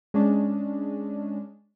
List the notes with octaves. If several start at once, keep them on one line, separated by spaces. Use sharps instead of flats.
G#3 C#4 D4